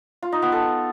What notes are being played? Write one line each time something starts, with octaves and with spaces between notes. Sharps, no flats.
F4
D#4
B3
A4